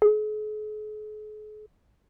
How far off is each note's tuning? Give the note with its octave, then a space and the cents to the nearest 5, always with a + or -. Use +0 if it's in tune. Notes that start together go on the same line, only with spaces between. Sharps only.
G#4 +45